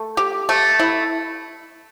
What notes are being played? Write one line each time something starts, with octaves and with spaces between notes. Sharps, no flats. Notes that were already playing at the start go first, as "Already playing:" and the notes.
Already playing: A3
G4
A3
E4